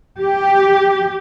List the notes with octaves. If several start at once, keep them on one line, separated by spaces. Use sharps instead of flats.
G4